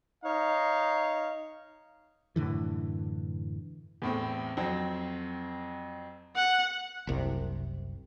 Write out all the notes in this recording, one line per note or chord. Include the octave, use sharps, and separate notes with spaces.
D#4 C#5 F5
F#2 A2 D3 E3
E2 A2 C4
F2 F#3 C4
F#5
F#1 C2 C3